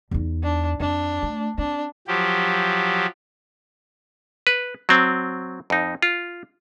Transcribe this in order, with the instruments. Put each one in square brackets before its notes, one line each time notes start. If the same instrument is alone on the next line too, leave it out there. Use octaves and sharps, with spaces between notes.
[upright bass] E2 D#4
[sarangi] D4
[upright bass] F2 [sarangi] D4
[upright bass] A3
[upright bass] C4 [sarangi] D4
[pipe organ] F3 F#3 G4
[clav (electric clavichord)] B4
F#3 C4
F2 D#4
F4